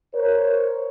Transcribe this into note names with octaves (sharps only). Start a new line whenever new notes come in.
A#4 C5 C#5